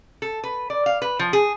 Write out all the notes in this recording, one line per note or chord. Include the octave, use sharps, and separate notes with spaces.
A4
B4
D5
F5
B4
F3
G#4